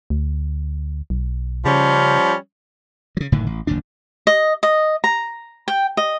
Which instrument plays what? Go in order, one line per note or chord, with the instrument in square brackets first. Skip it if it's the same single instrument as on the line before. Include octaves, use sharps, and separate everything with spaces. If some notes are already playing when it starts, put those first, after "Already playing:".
[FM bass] D2
B1
[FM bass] C#3 [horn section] F3 G3 C#4
[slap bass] C#3 F#3
F#1 A2 D3 D#3
A1
F#1 D#2 A#2 D4
[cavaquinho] D#5
D#5
A#5
G5
D#5